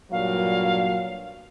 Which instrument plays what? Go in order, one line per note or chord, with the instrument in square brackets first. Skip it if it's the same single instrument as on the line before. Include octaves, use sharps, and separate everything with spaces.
[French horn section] G2 A#2 F#3 [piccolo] F5